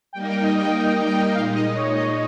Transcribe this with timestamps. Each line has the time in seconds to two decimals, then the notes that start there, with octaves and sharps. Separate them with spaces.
0.13 G3 A#3 D#4 A#4 G5
0.29 G5
0.43 D#5
0.59 G5
1.05 G5
1.35 A#2 G#3 D#4 F5
1.55 D#5
1.76 C#5
1.96 D#5